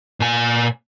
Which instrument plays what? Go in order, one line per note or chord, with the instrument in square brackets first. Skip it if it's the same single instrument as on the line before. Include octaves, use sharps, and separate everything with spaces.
[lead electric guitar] A#2 G#5